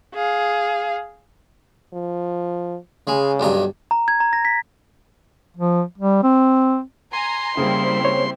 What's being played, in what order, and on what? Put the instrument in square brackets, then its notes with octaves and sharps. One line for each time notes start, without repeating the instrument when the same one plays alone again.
[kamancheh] G#4 F5
[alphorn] F3
[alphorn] C#3 [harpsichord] G#3
[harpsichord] B1 G2 A#5
[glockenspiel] A#5
G#6
A#5
A#6
B6
[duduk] F3
G3
C4
[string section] G#5 A#5 [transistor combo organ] C6
[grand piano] C#3 A#3 G#4 [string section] G3 C4 E4
[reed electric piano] C5 C#5